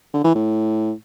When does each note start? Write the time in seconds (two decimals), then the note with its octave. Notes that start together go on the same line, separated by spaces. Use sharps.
0.13 D3
0.24 E3
0.35 A2